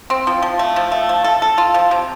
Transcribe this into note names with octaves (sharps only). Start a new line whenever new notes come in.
C4
F3
F3
A3
F3
A3
F3
A4
A4
F4
F3
C3